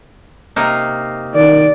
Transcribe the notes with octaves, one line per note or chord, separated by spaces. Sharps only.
C3 A#3 D#4
D#3 D5